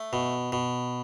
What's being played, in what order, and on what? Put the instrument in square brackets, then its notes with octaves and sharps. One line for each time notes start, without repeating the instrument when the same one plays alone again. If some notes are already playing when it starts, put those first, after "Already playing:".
Already playing: [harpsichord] A3
B2
B2